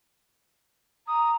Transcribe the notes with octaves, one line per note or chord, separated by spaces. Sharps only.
A#5 D#6